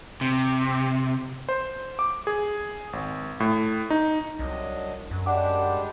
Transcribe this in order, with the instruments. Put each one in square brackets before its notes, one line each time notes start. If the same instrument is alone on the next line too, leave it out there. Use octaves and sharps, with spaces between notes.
[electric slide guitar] C3
[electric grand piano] C5
D6
G#4
G#1
A2
D#4
[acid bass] C2 [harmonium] F#3 D4 D#5
[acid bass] F#2
[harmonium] G3 G#3 G4 [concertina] D4 [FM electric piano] F#5 D6